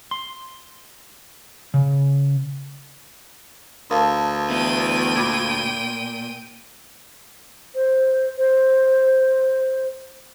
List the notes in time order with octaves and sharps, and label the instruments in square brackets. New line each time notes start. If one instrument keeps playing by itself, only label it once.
[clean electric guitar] C6
C#3
[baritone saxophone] D2 [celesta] A#4 F5 A5
[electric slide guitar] B3 E4 [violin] G5 D#7
[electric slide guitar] A#2 [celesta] B5 D6 G#6
[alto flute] C5
C5